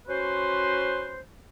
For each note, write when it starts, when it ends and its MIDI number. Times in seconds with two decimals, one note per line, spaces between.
0.07 1.20 61
0.07 1.20 66
0.07 1.20 71
0.07 1.20 72